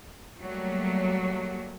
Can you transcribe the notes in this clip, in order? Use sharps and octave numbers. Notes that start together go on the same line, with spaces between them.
F#3 G3 A3 A#3